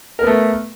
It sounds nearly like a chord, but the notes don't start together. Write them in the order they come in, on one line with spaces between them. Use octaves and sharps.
A#4 B3 A3